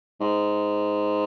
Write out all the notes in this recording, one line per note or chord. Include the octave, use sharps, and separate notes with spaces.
G#2